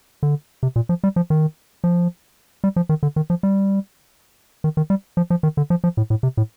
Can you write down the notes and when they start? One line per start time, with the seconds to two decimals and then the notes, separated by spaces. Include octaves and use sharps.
0.23 D3
0.63 C3
0.76 A#2
0.89 F3
1.04 G3
1.16 F3
1.30 D#3
1.84 F3
2.64 G3
2.76 F3
2.89 D#3
3.03 D3
3.16 D#3
3.30 F3
3.43 G3
4.64 D#3
4.77 D#3
4.90 G3
5.17 F3
5.30 F3
5.43 D#3
5.57 D3
5.70 F3
5.84 F3
5.97 A2
6.10 A2
6.23 C3
6.37 A2